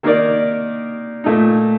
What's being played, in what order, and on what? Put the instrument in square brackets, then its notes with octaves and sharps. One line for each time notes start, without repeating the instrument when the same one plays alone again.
[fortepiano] D#3 A#3 D#4 A#4 D5
A#2 A3 D#4